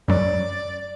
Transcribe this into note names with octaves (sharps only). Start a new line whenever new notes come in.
F#2 F#3 D5